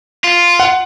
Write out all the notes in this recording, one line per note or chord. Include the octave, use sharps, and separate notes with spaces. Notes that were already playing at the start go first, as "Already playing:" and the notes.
F4
F#5